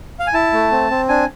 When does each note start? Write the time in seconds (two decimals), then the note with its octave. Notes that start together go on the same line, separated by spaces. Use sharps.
0.20 F5
0.27 G#5
0.34 E4 A5
0.53 A3
0.72 C4
0.90 C4
1.09 D4 G#5